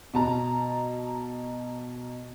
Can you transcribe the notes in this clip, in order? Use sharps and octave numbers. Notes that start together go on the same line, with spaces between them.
B2 A5 A#5